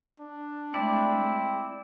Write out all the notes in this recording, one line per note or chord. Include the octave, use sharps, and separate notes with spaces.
D4
G#3 A3 C4 E4 D5